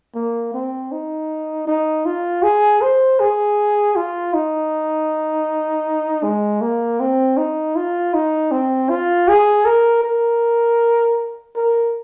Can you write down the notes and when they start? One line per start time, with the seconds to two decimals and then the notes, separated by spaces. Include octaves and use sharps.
0.15 A#3
0.54 C4
0.92 D#4
1.67 D#4
2.06 F4
2.43 G#4
2.82 C5
3.20 G#4
3.96 F4
4.34 D#4
6.23 G#3
6.61 A#3
7.00 C4
7.37 D#4
7.76 F4
8.14 D#4
8.52 C4
8.90 F4
9.28 G#4
9.66 A#4
10.04 A#4
11.56 A#4